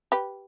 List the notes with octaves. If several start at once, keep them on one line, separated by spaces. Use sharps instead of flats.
G4 B4